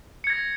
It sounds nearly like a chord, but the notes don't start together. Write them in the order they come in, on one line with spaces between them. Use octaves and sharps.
C#7 G#6 A#6